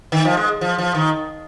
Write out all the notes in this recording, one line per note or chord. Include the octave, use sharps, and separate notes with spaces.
D#3
F3
G#3
F3
F3
D#3